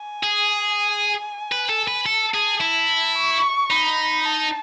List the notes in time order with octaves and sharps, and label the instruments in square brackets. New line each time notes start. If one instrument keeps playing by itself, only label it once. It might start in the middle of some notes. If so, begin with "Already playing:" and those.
Already playing: [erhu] G#5
[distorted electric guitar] G#4
B4
A4
B4
[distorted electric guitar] A4 [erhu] A5
[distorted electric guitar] G#4
E4
[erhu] C#6
[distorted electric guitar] D#4 [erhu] B5
[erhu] A5